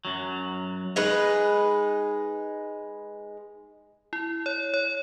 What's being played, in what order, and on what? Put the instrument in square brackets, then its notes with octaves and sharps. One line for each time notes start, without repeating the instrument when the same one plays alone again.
[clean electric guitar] F#2 F#3
[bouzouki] G#3 D#4 B4
[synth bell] E4
C#5
C#5